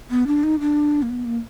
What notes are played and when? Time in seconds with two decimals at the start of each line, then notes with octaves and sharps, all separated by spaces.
0.10 B3
0.27 D4
0.43 D#4
0.60 D4
1.02 A#3
1.10 B3
1.25 A#3